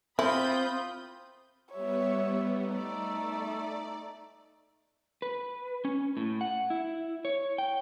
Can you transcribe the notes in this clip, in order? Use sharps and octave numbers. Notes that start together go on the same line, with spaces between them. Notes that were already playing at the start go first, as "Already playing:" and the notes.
C4 E4 F4 B5 D#6 G6
G3 B3 C#5 E5
A3 D#4 D5
B4
C#4
A2
F#5
E4
C#5
G5